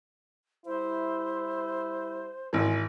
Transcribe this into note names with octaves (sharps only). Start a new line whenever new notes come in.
G3 E4 C5
G#1 E3